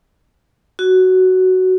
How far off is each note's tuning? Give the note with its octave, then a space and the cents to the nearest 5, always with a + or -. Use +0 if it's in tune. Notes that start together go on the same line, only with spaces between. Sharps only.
F#4 +10